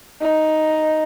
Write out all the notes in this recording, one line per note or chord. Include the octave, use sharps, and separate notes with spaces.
D#4